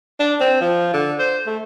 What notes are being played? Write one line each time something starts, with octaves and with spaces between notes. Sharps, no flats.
D4
C4
F3
D3
C5
A3